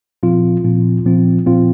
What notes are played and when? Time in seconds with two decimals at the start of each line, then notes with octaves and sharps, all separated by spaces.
0.23 A#2 F3 C4 F4
0.64 A#2 F3 C4 F4
1.05 A#2 F3 C4 F4
1.46 A#2 F3 C4 F4